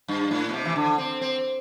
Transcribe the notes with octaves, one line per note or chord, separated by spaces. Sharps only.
G2
A2
B2
C3
E3
D3
C4
C4